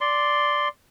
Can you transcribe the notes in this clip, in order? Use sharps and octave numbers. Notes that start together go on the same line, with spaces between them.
D5 C6